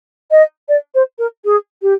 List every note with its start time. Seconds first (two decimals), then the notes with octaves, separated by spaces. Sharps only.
0.31 D#5
0.68 D5
0.94 C5
1.18 A#4
1.45 G#4
1.82 G4